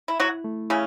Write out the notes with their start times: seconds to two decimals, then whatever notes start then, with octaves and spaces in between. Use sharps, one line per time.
0.08 E4
0.20 F#3 E4 F#4
0.44 A3
0.70 C#3 C#4 E4